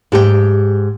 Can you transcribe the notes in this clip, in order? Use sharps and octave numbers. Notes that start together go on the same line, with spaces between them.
G#2 G4 G#4 G5